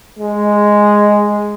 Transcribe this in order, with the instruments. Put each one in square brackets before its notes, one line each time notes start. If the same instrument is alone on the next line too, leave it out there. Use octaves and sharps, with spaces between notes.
[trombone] G#3